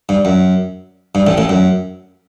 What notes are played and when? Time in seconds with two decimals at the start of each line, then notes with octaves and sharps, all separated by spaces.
0.09 G2
0.25 F#2
1.15 G2
1.27 A1 A2
1.38 A1 A2
1.49 F#2